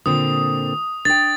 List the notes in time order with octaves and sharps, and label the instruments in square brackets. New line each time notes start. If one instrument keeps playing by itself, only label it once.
[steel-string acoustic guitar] A#2 D3 C4 [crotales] D#6
[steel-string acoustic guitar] D4 G5 [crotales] A6